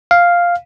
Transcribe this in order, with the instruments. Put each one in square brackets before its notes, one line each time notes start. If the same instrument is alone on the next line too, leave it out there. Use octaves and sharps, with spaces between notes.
[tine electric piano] F5